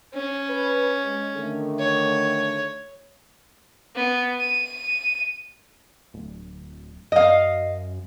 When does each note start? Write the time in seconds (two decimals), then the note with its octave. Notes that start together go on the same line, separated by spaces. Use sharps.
0.14 C#4
0.49 B4
1.03 G#3
1.33 D3 D#3 A3
1.79 C#5
3.95 B3
4.40 D#7
6.14 D1
7.12 F#2 D#5 F5